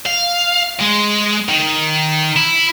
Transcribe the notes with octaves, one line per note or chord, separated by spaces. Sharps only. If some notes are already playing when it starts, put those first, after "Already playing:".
F5
G#3
D#3
E4